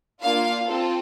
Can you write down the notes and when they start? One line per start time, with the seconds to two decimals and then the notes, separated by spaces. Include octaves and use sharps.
0.22 A#3 D4 F4 F5
0.66 C4 F4 A4